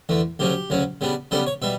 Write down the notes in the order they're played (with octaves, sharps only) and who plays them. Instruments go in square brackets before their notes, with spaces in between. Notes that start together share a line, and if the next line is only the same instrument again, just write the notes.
[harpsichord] E2 D3 A3
D2 C#3 F#3 C#4 G4
D2 C#3 F#3 C#4
C#3 G3 B3 D4
C#3 G3 B3 D4 A4
C#5
B2 G3 E5